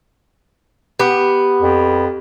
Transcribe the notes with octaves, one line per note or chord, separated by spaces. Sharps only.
B3 G4
F2